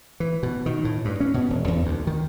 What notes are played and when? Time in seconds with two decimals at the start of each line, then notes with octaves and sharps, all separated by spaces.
0.20 E3
0.43 B2
0.66 D#3
0.85 A2
1.05 G2
1.20 C#4
1.34 B2
1.50 E1
1.68 E2
1.86 D2
2.07 D#3